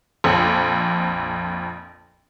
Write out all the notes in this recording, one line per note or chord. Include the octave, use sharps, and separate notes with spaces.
A#1 F2 A4